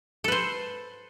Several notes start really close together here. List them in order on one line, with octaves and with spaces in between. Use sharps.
A4 B4 C5